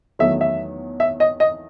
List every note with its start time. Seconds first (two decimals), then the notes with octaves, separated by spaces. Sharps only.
0.19 E2 D#3 F#3 A3 E5
0.41 E5
1.00 E5
1.20 D#5
1.40 D#5